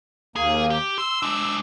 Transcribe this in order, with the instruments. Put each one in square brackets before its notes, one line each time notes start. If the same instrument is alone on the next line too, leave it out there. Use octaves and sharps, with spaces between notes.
[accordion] D#2 A#3 [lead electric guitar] G#4
[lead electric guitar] G4
[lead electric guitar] C6 [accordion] E6
[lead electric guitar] G#3 D4